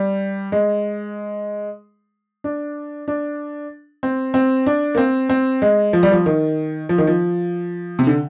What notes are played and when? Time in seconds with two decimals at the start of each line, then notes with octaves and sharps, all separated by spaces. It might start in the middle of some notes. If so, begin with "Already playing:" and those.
Already playing: G3
0.52 G#3
2.44 D4
3.08 D4
4.03 C4
4.34 C4
4.66 D4
4.95 A#3
4.98 C4
5.29 C4
5.62 G#3
5.93 F3
6.03 G3
6.12 F3
6.26 D#3
6.89 F3
6.98 D#3
7.07 F3
7.99 C3
8.07 D3